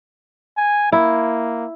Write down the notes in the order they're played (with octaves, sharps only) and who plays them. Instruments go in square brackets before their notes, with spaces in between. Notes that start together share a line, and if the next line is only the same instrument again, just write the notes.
[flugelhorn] G#5
[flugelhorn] A#3 [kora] E4